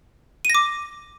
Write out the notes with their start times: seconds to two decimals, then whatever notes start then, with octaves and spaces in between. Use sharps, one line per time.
0.45 D#7
0.50 A#6
0.55 D6